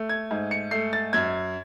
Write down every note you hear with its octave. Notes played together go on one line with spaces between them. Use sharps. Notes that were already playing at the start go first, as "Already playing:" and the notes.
Already playing: A3
G#6
G#2
C#7
A3 C7
A6
F#2 G#6